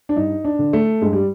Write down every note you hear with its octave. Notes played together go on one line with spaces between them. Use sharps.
D4
G2 D#4
D4
D3
A3
G2 G#3
G3